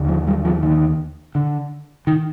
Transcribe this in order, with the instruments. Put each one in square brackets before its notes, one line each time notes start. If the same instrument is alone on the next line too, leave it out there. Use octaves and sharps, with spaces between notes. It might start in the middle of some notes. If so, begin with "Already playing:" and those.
Already playing: [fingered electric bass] D#2 D3
F3
G3
F3
D#3
D3
D#3